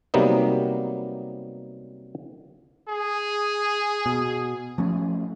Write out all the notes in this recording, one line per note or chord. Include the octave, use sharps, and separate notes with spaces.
C3 F#3 G3 A#3 B3 D#4
G#4
B2
F3 A3 C#4